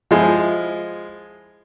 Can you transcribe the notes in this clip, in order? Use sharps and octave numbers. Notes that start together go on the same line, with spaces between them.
F3 G#3 E4